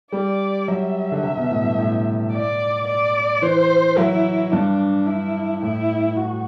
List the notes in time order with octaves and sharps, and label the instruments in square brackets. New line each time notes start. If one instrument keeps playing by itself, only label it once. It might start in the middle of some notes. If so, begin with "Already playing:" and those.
[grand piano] G3 [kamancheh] D5
[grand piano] F#3 [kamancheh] E5
[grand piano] D3
C3
B2
A2
G2
A2
[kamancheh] D5
D5
[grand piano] E3 [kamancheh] C5
[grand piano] F#3 [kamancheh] E4
[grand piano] G2 [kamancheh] D4
[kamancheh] E4
[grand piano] A2 [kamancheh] E4
[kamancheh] F#4